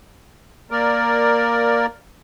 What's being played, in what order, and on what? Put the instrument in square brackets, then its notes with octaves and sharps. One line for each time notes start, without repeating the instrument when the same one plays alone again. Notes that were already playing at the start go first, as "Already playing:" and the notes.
[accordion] A#3 A#4 D5